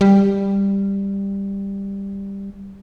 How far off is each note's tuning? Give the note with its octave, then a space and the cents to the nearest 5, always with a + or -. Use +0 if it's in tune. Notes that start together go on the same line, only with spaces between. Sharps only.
G3 +10